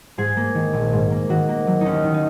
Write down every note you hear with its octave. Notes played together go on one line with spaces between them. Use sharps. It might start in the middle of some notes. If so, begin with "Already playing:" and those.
G#2 G#4
A#3
D#3
A#1
G#2
A#3
D#3 F#4
A#3
F#3
D#2 C#4 D#4
D#3
D#4